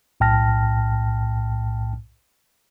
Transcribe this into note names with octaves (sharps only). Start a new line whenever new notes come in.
B1 A2 G5 A5 F6 A#6